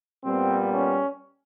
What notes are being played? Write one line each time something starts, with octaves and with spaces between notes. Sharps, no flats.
A#2 G3 B3 C4
C#4